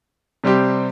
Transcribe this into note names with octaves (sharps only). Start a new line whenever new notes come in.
C3 G3 C4 G4